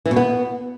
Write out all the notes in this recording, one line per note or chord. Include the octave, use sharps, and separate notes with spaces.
E3
B2
B3